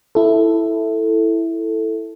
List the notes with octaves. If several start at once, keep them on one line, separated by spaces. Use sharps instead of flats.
E4 A4